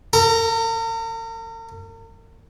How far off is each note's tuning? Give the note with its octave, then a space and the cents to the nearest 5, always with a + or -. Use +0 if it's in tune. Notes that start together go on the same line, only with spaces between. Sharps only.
A#4 -45 A#5 +0